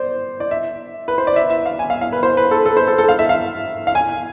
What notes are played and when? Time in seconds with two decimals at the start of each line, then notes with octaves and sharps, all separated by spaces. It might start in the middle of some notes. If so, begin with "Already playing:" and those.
Already playing: C5 D5
0.40 D5
0.51 E5
1.08 B4
1.18 C5
1.27 D5
1.36 E5
1.50 E5
1.66 F5
1.79 G#5
1.90 F5
2.01 F5
2.12 B4
2.23 C5
2.37 B4
2.51 A4
2.65 A4
2.77 C5
2.87 A4
2.98 A4
3.09 F5
3.19 E5
3.29 F5
3.87 F5
3.95 G#5